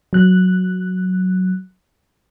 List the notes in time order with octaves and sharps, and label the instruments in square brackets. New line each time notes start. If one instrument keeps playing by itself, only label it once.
[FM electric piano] F#3 F#6